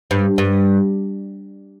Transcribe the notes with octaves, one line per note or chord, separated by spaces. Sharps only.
G2
G2